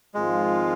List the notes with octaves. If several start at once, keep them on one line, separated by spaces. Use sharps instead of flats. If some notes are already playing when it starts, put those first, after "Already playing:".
G#1 G#2 F3 G#3 C4 F4